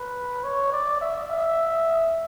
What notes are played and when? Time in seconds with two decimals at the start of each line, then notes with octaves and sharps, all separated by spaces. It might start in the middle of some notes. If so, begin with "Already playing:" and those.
Already playing: B4
0.44 C#5
0.72 D5
1.01 E5
1.31 E5